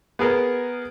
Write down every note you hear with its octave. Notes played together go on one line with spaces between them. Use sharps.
B3 G#4 A#4